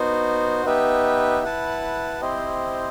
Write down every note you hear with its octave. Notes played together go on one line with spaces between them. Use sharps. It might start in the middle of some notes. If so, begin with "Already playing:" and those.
Already playing: B3 D#4 F#4 C5
B3 D#4 G4 B4 E5
E4 B4 F#5 A5
C4 E4 G4 C5 D#5